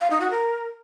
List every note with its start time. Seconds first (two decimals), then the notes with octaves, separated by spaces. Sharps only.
0.01 F5
0.10 D#4
0.20 F#4
0.30 A#4